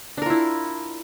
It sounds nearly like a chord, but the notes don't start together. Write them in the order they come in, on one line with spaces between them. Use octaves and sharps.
D4 A#4 F4 E4